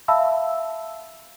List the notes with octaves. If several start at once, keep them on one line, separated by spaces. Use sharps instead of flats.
E5 F5 A5 B5 E6